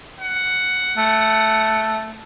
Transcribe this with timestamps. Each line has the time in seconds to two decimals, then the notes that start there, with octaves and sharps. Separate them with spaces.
0.21 F#5
0.98 A3